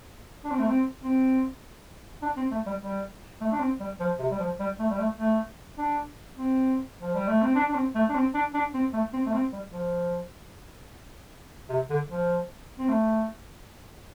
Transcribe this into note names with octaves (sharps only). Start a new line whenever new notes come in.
D4
C4
A3
C4
C4
D4
C4
A3
G3
G3
A3
D4
C4
G3
F3
C3
G3
F3
G3
A3
G3
A3
A3
D4
C4
F3
G3
A3
C4
D4
D4
C4
A3
D4
C4
D4
D4
C4
A3
C4
A3
C4
G3
F3
C3
D3
F3
C4
A3